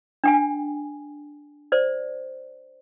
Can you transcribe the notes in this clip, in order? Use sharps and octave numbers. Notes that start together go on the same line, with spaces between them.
D4 G5 G#5
C5 D5